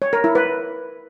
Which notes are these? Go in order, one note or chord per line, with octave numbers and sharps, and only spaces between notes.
C#5
A#4
E4
B4